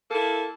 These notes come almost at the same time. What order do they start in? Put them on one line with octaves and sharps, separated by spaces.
A#3 A4 E4